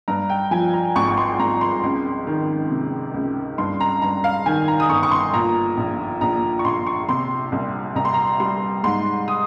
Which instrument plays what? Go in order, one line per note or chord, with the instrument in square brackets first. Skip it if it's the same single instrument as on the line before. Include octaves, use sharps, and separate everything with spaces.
[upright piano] G2 A#5
G5
F3 G#5
A#5
G#1 C#6
C#6
C6
G#1 A#5
C6
C#2
D#3
C3
C#2
G2 C6
A#5
G2 A#5
F5
D#3 G#5
A#5
D#6
G1 C#6
C#6
C6
A#2 A#5
A#1
A#1 A#5
C#6
A#1 C6
C#6
C3 C6
C2
C2 A#5
C6
A#5
G3 C6
G#2 C6
D#6